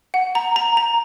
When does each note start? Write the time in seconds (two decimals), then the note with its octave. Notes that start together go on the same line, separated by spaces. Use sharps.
0.14 F#5
0.35 A#5
0.56 A#5
0.77 A#5